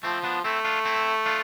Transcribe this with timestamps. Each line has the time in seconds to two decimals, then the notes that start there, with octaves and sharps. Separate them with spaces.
0.03 F3 A3 C4
0.24 B3 D4
0.44 A3 C4 E4
0.65 D4 F4
0.85 C4 E4
1.26 D4 F4